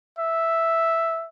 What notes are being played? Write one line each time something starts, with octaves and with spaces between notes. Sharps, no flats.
E5